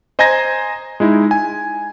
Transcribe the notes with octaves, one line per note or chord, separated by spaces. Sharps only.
C5 D#5 G#5 A#5 G#6 A#6
G#3 D#4 E4
G#5